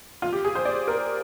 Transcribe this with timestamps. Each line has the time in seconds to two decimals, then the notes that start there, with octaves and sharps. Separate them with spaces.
0.22 F4
0.33 G4
0.44 G#4
0.55 C5
0.65 D5
0.88 A#4